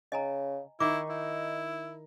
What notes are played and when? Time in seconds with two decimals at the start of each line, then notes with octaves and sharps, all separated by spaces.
0.12 C#3 D#5 G#5 A#5
0.80 D#3 D#4 E4 D6
1.09 E4